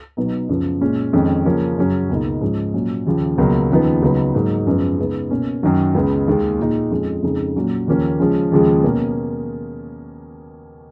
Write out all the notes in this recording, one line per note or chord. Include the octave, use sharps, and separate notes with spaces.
B2 F#3 B3 D#4
F#2 C#3 F3 B3
A#2 G#3 C#4
F2 D#3 G#3 C#4
C#3 F3 A#3 C#4
F#2 C#3 F#3 C#4
C#2 B2 A#3 D#4
G#2 F3 G#3 C#4
A#2 F#3 C#4
D#2 C#3 F3
C#2 B2 F#3 A#3
D#2 C#3 F3 B3 D#4
C#2 C#3 F#3 B3 D#4
G#2 F#3 A#3 D#4
F#2 C#3 F3 G#3 B3
C#3 G#3 B3 D#4
B2 A#3 C#4
F#2 D#3 F#3
C#2 C#3 G#3 B3
D#2 D#3 G#3
A#2 G#3 D#4
F2 F3 G#3 C#4
F2 C#3 G#3 D#4
A#2 F#3 C#4
D#2 C#3 F3 A#3 C#4
C#3 F3 G#3 C#4
D#2 C#3 F3 G#3
B2 A#3 C#4